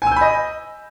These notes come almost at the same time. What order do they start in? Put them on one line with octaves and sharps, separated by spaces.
G#5 E6 G6 B5 D#5